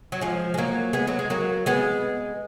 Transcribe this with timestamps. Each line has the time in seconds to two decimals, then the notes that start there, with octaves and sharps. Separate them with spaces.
0.12 F#3
0.21 F3 G#3
0.54 G#3
0.58 F#3 A#3
0.93 G#3 B3
1.07 F#3
1.19 G#3
1.30 F#3 A#3
1.66 G#3 B3